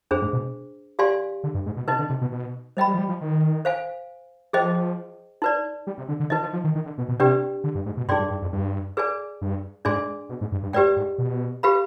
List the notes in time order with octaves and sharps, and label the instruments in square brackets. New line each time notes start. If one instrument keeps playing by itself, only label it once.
[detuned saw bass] F2 [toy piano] D4 G#4 C5
[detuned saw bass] G#2
B2
[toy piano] G4 D5 F5 G#5 C6
[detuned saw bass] D3
G2
G#2
B2
[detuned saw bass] C3 [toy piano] D#4 B4 D#5
[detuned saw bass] D3
C3
B2
B2
[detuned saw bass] G3 [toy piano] C5 D#5 G5 B5
[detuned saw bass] G3
F3
G3
F3
D#3
[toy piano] C5 F5 G#5
[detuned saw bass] F3 [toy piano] G#4 C5 D#5 G5
[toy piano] D#4 B4 D5
[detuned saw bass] G3
C3
D3
D3
[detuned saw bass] D#3 [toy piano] D#4 B4 D#5
[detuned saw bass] F3
F3
D#3
D#3
D3
B2
B2
[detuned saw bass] C3 [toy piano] D4 G4 B4 D5 G5
[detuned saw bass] D3
G2
G#2
B2
[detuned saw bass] G2 [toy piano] D#4 G#4 D5 G5 C6
[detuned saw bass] G2
G2
F2
G2
[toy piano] G#4 B4 D5 G#5
[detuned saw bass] G2
[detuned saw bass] G#2 [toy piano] D4 G#4 D5 G#5 C6
[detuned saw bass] B2
G#2
G2
G2
[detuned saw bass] G#2 [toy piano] G4 B4 D5 G5
[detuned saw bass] G#2
B2
[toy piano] G4 B4 F5 B5